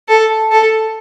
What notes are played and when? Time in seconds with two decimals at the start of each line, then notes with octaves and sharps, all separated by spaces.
0.08 A4
0.51 A4